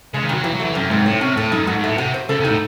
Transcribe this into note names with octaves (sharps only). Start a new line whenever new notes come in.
C#3 G#3
D#3
C3 F#3
C3 E3
F#3
E3 A3
F#2 C3
G#2 C4
A2 C#5
C3 C#4
A2 A4
F#2 D#4
G#2 F#4
G#2
A2 A3
C3 F#4
C5
C#3 A4
C3
D#4
A2